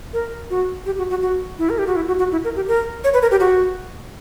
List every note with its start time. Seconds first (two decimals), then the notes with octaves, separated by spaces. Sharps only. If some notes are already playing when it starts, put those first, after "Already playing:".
0.13 A#4
0.50 F#4
0.86 G4
0.98 F#4
1.10 F#4
1.22 F#4
1.59 E4
1.70 A#4
1.78 G4
1.87 F#4
1.96 E4
2.07 F#4
2.19 F#4
2.32 E4
2.44 A#4
2.56 G4
2.68 A#4
3.04 C#5
3.14 B4
3.22 A#4
3.31 G4
3.40 F#4